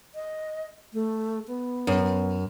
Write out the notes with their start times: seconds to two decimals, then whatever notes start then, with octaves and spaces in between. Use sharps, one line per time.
0.15 D#5
0.93 A3
1.48 B3
1.87 F#2